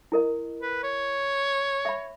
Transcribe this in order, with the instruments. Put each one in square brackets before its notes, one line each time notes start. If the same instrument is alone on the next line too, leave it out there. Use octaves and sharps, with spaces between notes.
[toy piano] E4 A#4 D#5
[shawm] B4
C#5
[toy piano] E5 B5